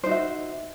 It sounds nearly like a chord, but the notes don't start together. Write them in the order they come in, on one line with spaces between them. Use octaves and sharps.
C5 D#4 F#4 E5